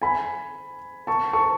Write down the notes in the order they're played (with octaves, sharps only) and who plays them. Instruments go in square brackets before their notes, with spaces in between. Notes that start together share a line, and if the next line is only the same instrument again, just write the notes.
[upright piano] G#5 B5
A5 C#6
A5 C#6